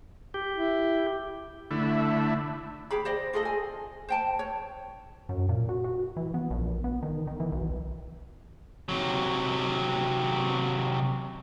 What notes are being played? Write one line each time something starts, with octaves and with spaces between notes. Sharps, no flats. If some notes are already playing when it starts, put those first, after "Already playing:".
G4
E4
D3 A3 E4
G4 G#4 B5
C5 D5 D#5
F4 G#4 A4 D#5
G#5
C5 G5 A5
C#5
F#2
A#2
F#4
F#4
E3
B3
A#1
B3
D#3
D#3
E3
B1
C3 F#3